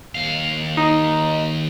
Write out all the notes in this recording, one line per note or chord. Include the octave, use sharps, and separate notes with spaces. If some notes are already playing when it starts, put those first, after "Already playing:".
D#2 F5
D#4